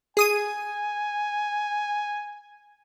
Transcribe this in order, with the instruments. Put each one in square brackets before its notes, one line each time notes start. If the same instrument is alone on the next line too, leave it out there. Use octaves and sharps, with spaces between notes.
[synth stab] G#4 D#6 D#7 [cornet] G#5